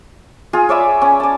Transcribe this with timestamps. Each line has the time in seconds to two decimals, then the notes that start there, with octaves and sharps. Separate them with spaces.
0.53 F4 G#4
0.69 C#5 D5 E5 B5
1.02 C#4
1.20 D5 A5